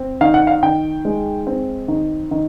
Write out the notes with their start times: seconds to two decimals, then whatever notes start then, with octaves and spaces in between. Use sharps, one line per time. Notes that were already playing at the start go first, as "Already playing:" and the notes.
Already playing: C4
0.21 D#3 F5
0.34 F#5
0.47 F5
0.63 D#3 G5
1.05 G#3
1.47 C4
1.88 D#3
2.31 D#3